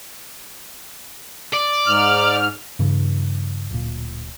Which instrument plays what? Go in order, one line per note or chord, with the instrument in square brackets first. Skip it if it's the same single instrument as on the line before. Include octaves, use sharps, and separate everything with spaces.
[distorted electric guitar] D5
[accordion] G#2 F6
[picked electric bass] G2 C#3 E3
D1 A#2